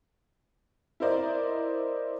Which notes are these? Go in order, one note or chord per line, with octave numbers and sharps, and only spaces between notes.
E4 A#4 C5 D5 D#5